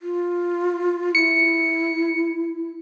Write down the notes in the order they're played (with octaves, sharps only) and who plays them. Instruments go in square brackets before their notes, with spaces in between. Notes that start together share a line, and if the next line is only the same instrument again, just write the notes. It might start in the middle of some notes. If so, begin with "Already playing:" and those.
[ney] F4
[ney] E4 [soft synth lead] C#7